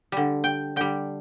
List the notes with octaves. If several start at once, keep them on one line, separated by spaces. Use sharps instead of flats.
D3 G3
G5
D3 G3 G5